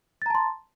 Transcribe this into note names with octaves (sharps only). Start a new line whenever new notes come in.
A5 A#5 C6 A6